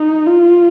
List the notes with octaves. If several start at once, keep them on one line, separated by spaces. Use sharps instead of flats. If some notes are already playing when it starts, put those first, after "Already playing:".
Already playing: D#4
F4